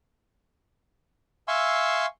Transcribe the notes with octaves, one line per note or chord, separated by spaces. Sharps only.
E5 F5 G#5 C6 C#6 E6